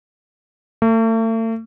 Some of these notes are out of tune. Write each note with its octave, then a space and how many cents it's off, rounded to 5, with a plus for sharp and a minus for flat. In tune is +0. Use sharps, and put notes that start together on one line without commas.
A3 +40